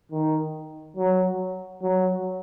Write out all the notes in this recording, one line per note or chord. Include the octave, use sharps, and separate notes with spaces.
D#3
F#3
F#3